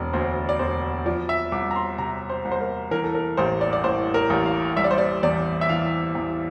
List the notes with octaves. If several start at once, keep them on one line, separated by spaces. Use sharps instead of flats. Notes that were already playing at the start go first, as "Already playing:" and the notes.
Already playing: E1 D5
D2 C5
D5
E1 C5
F3 D5
E5
C2 D6
A#5
C6
C3 A#5
C5
C2
C5
A#4
E3 A#4
A4
A#4
A1 C5
D5
D5
A2 C5
A#4
A1
F5
G3 E5
D5
C5
D5
E2 D5
E5
E3 F5
E2